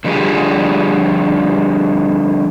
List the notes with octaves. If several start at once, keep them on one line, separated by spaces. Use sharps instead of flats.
D3 F3 G3 E4 G4 G#4